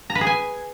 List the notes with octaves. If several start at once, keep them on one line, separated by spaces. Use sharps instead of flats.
A#5
B4
G#4
G#5